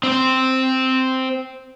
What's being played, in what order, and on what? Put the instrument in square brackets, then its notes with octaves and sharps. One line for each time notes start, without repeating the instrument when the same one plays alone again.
[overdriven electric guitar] C4 C5